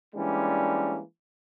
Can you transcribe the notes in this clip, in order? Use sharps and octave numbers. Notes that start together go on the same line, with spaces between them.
E3 G3 G#3 A#3 C#4 D4